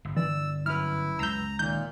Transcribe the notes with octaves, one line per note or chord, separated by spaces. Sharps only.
G1
E3 D5 E6
F#2 E4 B4 F6
C#2 A#5 E6 G6
A#2 D#3 G6